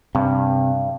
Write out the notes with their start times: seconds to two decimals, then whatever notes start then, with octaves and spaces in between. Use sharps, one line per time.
0.15 G2 C3